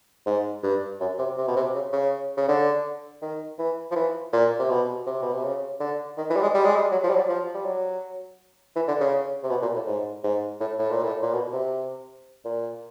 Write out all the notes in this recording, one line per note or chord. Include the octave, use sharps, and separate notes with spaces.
G#2
G2
F#2
C3
C3
B2
C3
C#3
C#3
C#3
D3
D#3
E3
F3
E3
A#2
C3
B2
C3
B2
C3
C#3
D3
D#3
E3
G3
G#3
G3
G#3
G3
F#3
F3
G3
F#3
F3
G3
F#3
E3
D3
C#3
C3
B2
A#2
A2
G#2
G#2
A2
A2
A#2
A2
A#2
B2
C3
A#2